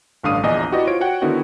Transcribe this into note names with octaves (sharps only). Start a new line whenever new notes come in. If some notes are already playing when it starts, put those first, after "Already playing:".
A1 G2 D3 F5 D#6 D#7
A#1 E2 D5 D#5 G#5
E4 F#4 G4 B4 D5 D#5
F4 C5 C#5 D7
F#4 C#5 F#5 G5
D3 D#3 B3 E4 F#4